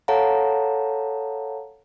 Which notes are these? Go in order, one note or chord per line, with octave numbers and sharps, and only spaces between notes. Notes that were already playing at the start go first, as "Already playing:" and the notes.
A4 C#5 F5 F#5 A5 A#5